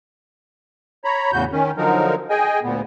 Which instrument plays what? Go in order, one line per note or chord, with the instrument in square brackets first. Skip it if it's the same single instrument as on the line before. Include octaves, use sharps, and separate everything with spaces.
[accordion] C#5 A#5 B5
E2 A2 C#3 F#4 G6
D#3 C#4
D3 F3 F#3 D#4 A#4
G#4 D#5 G5 G#5
D2 A#2 B3